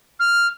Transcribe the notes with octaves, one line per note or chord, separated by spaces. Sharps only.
F6